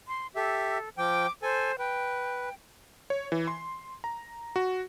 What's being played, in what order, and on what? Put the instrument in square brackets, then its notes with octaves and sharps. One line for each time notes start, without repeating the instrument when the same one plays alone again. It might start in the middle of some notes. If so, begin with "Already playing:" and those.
[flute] C6
[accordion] G4 E5 [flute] A4
[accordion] F3 G5 [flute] D6
[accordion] A4 G#5 [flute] C5
[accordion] B4 [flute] G5
[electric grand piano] C#5
E3
C6
A#5
F#4